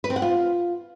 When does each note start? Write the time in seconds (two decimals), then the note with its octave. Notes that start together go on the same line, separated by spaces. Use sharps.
0.04 B4
0.10 C4
0.16 F#5
0.22 F4